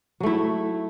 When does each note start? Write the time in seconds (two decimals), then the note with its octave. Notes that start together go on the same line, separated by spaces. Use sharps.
0.20 F#3
0.23 A3
0.26 E4